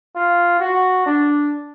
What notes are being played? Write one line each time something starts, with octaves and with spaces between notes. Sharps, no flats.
F4
F#4
D4